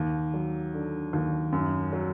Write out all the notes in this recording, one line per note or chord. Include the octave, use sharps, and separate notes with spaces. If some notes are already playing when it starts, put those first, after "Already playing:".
Already playing: D#2
F#3
D3
D#2
F#2
F#3